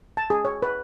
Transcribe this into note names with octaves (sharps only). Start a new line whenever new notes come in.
A5
G#4
C#5
B4